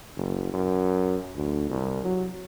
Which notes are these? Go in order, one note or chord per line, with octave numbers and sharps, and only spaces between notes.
F#1
F#2
D2
C2
F#3